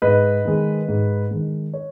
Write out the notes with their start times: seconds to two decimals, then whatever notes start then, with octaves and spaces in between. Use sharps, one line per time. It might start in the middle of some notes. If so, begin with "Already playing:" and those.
0.02 G#2 B4 D#5
0.45 D#3 G#3
0.88 G#2
1.31 D#3 G#3
1.73 C#5